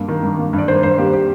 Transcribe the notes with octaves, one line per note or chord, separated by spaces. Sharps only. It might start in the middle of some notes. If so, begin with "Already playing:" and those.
Already playing: G2 A#3
D#3
G2
A#3
G2
D5
D#3 C5
G2 C5
A#3 G4
G4